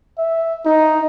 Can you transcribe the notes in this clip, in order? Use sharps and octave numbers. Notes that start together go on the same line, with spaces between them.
E5
D#4